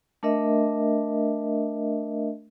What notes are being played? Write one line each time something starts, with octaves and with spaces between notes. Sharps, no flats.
A3 D4 A#4 D#5 E5